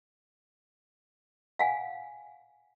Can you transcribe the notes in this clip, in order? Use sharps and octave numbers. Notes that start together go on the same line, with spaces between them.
F5 F#5 G#5